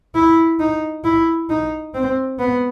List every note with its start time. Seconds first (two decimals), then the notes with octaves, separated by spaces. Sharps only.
0.15 E4
0.60 D#4
1.04 E4
1.50 D#4
1.94 C4
2.39 B3